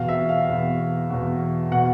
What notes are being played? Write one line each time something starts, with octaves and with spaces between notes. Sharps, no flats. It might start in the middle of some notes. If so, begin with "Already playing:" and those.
Already playing: E2 B2 F5
E5
F5
E2 B2
E2 B2
B2 F#5